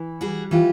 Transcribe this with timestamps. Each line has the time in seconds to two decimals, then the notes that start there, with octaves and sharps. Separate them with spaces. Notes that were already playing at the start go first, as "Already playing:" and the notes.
Already playing: E3
0.21 G3 F#4 G#4
0.51 E3 F4 G4